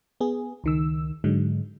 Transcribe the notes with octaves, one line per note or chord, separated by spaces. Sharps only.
B3 G#4
C#2 D#3 E6
G#2 D3 F#3 G#3